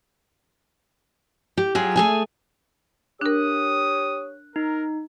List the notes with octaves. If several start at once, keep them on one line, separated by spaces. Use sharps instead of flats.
G4
F#3 F4 G4 G#4
A3 G#4 G#5
D4 G4 A#4 C#5 D#6 F#6
D#4 A#4